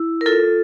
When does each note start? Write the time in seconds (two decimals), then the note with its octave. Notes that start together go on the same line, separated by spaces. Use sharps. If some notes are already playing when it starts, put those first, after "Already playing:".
Already playing: E4
0.21 A#4
0.26 F4 A4